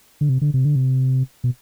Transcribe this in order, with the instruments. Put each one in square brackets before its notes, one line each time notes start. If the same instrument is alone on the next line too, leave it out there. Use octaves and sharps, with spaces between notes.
[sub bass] D3
C3
D3
C3
D3
C3
B2